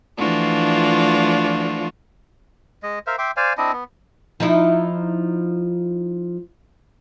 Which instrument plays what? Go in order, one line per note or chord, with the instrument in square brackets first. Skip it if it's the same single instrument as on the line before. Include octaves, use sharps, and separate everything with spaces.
[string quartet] E3 F3 A3 D4 F4 F#4
[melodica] G#3 D#5
A#4 C5 E5 F5
E5 G5 C6 D6
C5 D5 F5 G#5
C4 D4 E4 D#5
B3
[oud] F3 D#4 E4